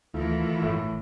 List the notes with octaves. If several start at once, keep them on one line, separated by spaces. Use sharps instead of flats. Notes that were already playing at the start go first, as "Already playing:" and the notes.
D2 D#3 E3 A3 E4 F4
G1 A2